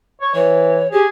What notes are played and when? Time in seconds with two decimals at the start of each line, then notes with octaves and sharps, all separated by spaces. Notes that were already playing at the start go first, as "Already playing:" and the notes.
0.21 C#5
0.35 E3 C#5
0.92 G4 G#4